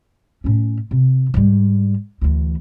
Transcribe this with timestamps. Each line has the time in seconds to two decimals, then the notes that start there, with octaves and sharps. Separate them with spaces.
0.44 A2 C#4
0.91 C3
1.34 G#2 G3
2.21 D2 E3